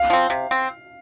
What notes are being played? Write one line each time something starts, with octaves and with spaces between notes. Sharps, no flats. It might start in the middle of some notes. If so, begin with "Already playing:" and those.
Already playing: F5
F3 C4
C3
C4